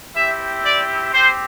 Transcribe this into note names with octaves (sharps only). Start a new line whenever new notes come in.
C4 E4 G4 E5
D5
C4 G4 C5